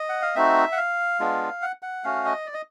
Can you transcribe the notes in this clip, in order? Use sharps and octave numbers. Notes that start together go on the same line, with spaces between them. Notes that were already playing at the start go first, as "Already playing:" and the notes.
Already playing: D#5
F#5
F5
A3 C4 D#4 F#4 E5
F#5
F5
G#3 B3 D4 F4
F#5
F#5
A3 C#4 F#4 F5
D#5
D5
D#5